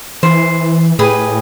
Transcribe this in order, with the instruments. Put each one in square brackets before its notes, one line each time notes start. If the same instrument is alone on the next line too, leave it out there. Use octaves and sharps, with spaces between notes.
[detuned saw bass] E3 [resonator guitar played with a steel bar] C5
[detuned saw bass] A2 [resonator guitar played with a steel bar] G4 G#4 B4